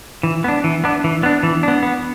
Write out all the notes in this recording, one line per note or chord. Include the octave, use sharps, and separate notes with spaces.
E3
B3 D4
E3
B3 D4
E3
B3 D4
E3
B3 D4
B3